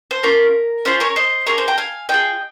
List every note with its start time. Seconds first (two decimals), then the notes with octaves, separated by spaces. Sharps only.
0.11 C5
0.23 A#3 C#4 F4 A#4
0.85 C#4 F4 G#4 C5
1.00 A#4 C#5
1.16 C5 D#5
1.47 A#3 F4 G#4 A#4 C#5
1.58 C5
1.68 G5 A#5
1.78 F5 G#5
2.09 C#4 F4 G#4 D#5 G5